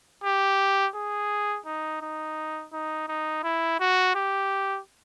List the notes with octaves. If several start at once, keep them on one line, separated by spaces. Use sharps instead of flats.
G4
G#4
D#4
D#4
D#4
D#4
E4
F#4
G4